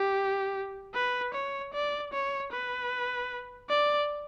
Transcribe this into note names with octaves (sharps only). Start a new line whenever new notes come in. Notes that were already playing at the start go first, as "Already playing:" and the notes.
Already playing: G4
B4
C#5
D5
C#5
B4
D5